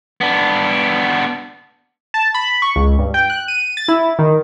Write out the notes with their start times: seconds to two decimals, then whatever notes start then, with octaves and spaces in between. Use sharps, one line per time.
0.21 B3 D4
2.14 A5
2.34 B5
2.62 C#6
2.76 C#2
2.99 G2
3.14 G5
3.30 F#6
3.48 D#7
3.77 A6
3.88 E4
4.19 D#3